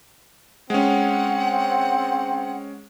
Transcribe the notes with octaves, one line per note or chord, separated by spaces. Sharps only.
G#3 C4 C#4 F#5